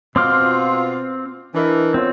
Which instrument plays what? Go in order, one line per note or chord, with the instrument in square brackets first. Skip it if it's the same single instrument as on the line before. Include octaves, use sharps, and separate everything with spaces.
[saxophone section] B2 F4 [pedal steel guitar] C4 D6 F6 [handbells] C6
[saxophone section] E3 [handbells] D4 A#4 D#5
[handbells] B3 F4 C#5 [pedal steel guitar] C4